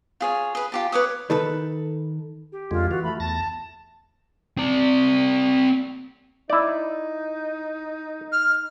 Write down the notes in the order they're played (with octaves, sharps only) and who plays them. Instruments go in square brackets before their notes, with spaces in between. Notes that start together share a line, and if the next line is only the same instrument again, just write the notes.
[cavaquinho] F4 G#4 C#5
G#4 B4
F4 G4 A5
B4 C#5 D6 D#6
[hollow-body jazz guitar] D#3 A4 B4
[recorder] G4
[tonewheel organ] F2 D3 G#3 [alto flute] F4
[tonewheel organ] E3 F4 [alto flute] F#4
[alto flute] A3 [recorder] B5
[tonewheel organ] E2 A6 A#6 [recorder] A5
[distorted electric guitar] C4 D5
[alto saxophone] D#4 [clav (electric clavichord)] E4 D5
[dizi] F6